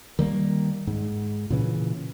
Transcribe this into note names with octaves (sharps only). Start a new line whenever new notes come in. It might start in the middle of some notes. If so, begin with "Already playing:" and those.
D#3 G3 A#3
G#2
A#2 C#3 E3